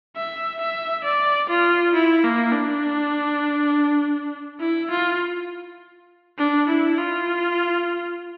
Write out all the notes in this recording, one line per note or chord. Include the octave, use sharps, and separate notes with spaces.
E5
E5
D5
F4
E4
A#3
D4
E4
F4
D4
E4
F4